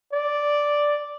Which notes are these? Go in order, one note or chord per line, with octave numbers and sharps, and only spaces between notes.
D5